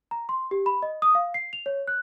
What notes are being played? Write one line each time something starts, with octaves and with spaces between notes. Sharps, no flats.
A#5
C6
G4
B5
D#5
D#6
F5
C7
F7
C#5
F#6